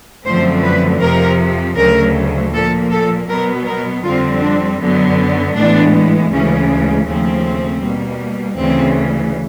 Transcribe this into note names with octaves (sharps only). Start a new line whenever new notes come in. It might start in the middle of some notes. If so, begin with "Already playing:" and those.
F#2 D3 F3 A3 C4 C5
B4
F2 C3 F3 A#4
D2 C#3 F#3 A3 A#4
A#2 F3 A#3 A4
A4
B2 F#3 B3 A#4
A#4
F2 D3 G3 C4 F4
D4
F#2 D3 F#3 B3
A2 E3 G#3 B3 D4
D2 C#3 E3 G#3 C#4
D#2 C#3 F3 A3 C4
B2 G3 A#3
D2 C#3 E3 C4